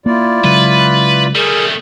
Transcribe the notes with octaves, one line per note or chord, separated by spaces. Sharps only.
A#3 E4 F4 D5
C#3 F#3 G#3 B4
G3 A3 G#4 A#4